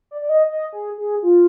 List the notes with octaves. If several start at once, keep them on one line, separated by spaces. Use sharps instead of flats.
D5
D5
D#5
D#5
G#4
G#4
F4